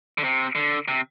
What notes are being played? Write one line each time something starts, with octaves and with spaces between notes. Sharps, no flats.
D3
C3
D3
C3